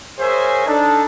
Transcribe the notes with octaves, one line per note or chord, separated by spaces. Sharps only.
G#4 A#4 C5 C#5 E5 G#5
D4 D#4 A4